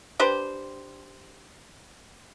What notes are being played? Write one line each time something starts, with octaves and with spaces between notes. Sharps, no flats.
D4 G4 B4 C5